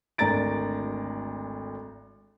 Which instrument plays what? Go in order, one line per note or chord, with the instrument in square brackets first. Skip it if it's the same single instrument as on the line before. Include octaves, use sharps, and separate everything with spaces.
[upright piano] G#1 D2 D4 A#5 A6 D7